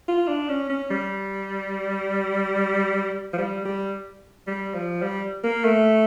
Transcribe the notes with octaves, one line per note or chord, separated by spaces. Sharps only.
F4
D4
C#4
C#4
G3
F3
G3
G3
G3
F3
G3
A#3
A3